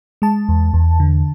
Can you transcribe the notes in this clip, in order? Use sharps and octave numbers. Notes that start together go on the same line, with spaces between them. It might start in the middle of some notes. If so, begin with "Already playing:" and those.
G#3 A5
E2
E2
D3